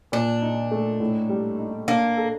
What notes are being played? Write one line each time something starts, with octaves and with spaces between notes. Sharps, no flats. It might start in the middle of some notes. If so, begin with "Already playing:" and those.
A#2 D4
D#4
A3
A2
G3
D#4
A#3 D4
A4